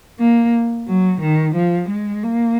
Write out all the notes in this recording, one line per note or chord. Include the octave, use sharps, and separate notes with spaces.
A#3
F#3
D#3
F3
G#3
A#3